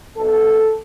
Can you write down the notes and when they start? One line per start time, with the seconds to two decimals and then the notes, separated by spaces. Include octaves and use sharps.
0.17 B1 B2 A4